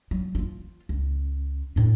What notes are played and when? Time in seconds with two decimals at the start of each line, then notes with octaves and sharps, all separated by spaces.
0.11 F#3
0.35 D#4 F4
0.89 C#2
1.76 A2 D4